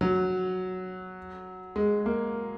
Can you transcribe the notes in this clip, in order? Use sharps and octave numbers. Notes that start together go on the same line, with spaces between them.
F#3
G#3
A#3